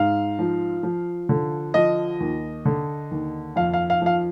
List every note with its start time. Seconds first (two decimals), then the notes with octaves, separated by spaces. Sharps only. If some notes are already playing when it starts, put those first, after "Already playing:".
Already playing: G#2 F5
0.39 F3
0.83 F3
1.29 D3
1.74 F3 D#5
2.20 D#2
2.65 D3
3.11 D#2
3.56 F2 F5
3.73 F5
3.90 F5
4.02 F3 F5